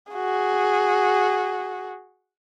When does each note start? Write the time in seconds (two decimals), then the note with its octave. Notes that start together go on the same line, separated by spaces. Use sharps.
0.12 F#4 G#4